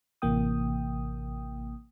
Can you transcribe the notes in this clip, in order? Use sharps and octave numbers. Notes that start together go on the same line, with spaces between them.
A1 C3 E3 A#3 G5 D#6